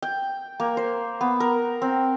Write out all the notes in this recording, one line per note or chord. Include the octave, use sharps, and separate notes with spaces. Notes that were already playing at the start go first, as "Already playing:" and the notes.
G5
A#3
C5
B3
A#4
C4